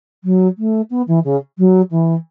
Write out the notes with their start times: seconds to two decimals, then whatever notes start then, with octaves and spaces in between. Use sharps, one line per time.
0.24 F#3
0.58 A3
0.90 B3
1.08 E3
1.24 C#3
1.58 F#3
1.91 E3